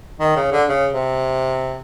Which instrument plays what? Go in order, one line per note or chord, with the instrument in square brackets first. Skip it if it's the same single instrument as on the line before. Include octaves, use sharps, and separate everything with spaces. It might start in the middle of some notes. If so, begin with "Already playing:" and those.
[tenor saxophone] D#3
C#3
D3
C#3
C3